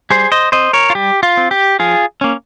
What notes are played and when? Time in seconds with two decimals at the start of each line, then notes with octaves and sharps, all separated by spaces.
0.10 G3 G#4 C5
0.32 C5 D#5
0.52 C4 C5 D#5
0.73 A#4 C#5
0.90 F4
0.95 G3 G4
1.23 F4
1.37 C4
1.51 G4
1.79 F3 F4 G#4
2.21 A#3 C#4